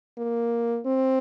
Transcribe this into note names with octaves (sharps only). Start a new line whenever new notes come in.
A#3
C4